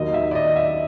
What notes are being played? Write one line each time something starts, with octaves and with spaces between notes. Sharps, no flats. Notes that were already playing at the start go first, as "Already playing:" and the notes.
Already playing: D#2 D#3 F#3 D#5
E5
D5
D#5
E5